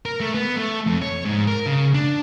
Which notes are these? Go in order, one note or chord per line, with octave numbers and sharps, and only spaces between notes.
A#4
A3
B3
A3
F2
C#5
G#2
A#4
C#3
D4